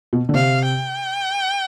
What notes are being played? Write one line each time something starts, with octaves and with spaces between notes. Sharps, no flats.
B2
D3
C3 F5
G5